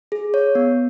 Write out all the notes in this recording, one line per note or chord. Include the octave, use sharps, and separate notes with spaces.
G#4
C#5
B3